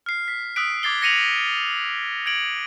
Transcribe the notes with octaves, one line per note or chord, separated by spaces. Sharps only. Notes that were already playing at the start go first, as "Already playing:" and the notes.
F6 C7
B6
D#6 E6 F#6 B6 D7
D6 G#6 A6 C7 G7
G#6 A#6 C#7 D#7 F7 F#7
G#6 C#7 D7 F#7